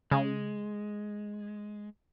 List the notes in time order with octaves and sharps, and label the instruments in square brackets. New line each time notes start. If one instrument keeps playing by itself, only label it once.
[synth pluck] C#3 [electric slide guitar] G#3